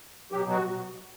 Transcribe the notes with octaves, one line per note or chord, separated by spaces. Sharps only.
B2 F#3 G4
F#4